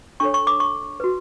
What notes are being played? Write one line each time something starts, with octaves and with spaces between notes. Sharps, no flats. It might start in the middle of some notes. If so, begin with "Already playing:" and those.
D4 A4 C#5 C#6
C#6
D6
C#6
F#4 B4